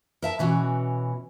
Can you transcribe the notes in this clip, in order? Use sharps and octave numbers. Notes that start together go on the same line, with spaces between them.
A#4 E5 A5
B2 E3 C#4 F#4